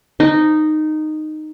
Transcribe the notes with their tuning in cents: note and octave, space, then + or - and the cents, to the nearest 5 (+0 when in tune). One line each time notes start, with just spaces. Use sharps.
D#4 -10